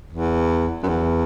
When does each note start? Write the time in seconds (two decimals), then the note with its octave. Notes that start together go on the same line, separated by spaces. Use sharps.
0.13 E2
0.83 F#2
0.88 E2